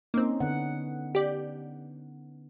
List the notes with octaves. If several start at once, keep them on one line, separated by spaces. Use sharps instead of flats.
A#3 C4 C#4 D#4
D3 B3 F#5
G4 D5